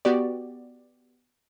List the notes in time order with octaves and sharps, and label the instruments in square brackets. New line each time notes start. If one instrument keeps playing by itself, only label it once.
[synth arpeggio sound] B3 F#4 G4 D5